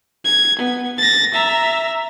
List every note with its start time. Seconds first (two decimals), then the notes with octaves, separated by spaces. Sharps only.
0.25 G#6
0.59 B3
0.98 A6 A#6
1.33 E5 A#5